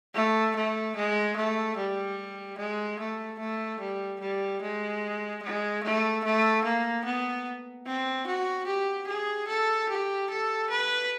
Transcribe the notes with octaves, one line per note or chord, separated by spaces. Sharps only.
A3
A3
G#3
A3
G3
G#3
A3
A3
G3
G3
G#3
G#3
A3
A3
A#3
B3
C4
F#4
G4
G#4
A4
G4
A4
B4